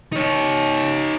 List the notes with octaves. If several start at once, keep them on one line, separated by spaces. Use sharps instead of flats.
D#4 C#5